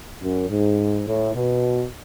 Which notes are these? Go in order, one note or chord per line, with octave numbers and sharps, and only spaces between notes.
F#2
G#2
A2
B2